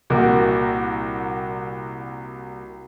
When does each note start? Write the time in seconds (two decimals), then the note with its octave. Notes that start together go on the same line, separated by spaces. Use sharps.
0.10 C2 A#2 F#4 A#4 D6